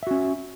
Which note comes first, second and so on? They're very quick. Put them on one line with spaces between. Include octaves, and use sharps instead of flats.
E5 F#4 C#4